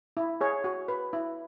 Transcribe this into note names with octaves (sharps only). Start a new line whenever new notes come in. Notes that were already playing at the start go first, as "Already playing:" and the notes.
E4
G#4 C#5
F#4
B4
E4